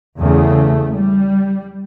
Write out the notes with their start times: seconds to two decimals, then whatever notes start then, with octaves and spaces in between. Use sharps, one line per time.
0.18 E2 C#3 A3
0.93 G3